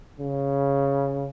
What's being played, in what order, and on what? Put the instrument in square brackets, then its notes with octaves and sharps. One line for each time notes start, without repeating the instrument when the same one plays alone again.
[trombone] C#3